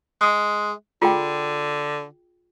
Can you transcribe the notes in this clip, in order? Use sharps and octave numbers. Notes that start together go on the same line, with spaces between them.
G#3
D3 F4 G#4 G5